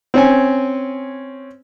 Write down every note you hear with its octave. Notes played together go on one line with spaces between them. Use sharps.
C4 C#4 G#5